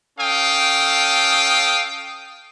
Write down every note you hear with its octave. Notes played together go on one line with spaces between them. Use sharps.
C#4 A4 F5 G5 D#6